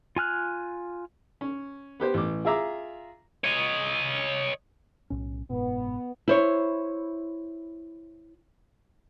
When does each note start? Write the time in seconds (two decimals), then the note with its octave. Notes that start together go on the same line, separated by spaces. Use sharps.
0.16 F4 G#5 F6 F#6
1.41 C#4
2.00 B3 G4 C5
2.14 A1 D6
2.45 F4 G#4 E5 A#5 D6
3.44 C#5 D#5
5.10 B1 A2 C#4
5.50 F#1 G#2 B2 B3
6.28 E4 C5 C#5